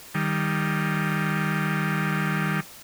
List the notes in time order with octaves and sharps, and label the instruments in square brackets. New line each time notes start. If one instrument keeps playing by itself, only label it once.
[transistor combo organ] D#3 G3